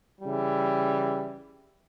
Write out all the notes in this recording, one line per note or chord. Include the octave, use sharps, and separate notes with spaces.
C#3 E3 G3